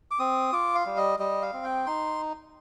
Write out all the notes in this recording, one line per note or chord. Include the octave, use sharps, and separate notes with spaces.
D6
C4 D#6
F4 D6
F5
G3
D#5
G3 D#5
F5
C4
G5
D#4 C6